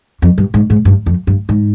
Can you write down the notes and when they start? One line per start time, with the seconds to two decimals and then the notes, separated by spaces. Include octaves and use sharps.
0.22 F2
0.38 G2
0.54 G#2
0.70 G#2
0.85 G2
1.06 F2
1.27 G2
1.49 G#2